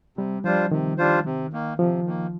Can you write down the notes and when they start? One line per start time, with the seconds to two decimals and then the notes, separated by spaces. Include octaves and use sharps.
0.17 C3 G3
0.44 F3 G3 D4 F4 C5
0.71 C3 D#3
0.98 G3 D4 F4 C5
1.25 C3
1.52 D#3 A#3
1.79 C3 F3
2.06 D#3 A#3